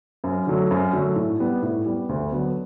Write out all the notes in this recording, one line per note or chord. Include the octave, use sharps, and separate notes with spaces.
F#2
D3 F#3 A3
F#2
D3 F#3 A3
A2
G3 B3
A2
G3 B3
D2
D3 F#3 B3